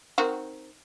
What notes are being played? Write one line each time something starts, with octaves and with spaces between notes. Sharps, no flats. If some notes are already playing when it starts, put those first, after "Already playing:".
D#3 C4 F#4